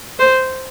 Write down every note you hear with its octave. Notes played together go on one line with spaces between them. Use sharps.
C5